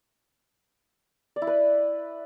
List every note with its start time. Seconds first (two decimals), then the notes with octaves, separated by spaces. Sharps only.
1.36 D5
1.42 E4
1.47 B4